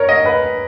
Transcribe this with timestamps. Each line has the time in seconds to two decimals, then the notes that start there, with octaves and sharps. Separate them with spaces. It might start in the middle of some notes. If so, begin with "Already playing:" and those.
Already playing: A#4 C#5
0.09 D#5
0.26 B4